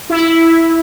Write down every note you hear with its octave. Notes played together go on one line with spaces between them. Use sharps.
E4